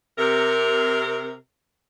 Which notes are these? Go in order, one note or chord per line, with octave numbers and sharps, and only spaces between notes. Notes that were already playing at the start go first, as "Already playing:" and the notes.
C3 A#4